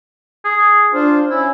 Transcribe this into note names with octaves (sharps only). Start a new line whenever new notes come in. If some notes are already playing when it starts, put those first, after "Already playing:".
G#4
D4 F4 C5
C#4 E4